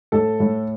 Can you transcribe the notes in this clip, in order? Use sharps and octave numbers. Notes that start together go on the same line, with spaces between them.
A2 A4 A5
A2